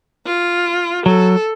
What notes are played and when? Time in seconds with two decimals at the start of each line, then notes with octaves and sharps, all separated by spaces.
0.26 F4
1.06 F#3 A4